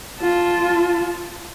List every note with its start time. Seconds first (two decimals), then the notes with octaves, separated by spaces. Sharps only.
0.21 F4 A5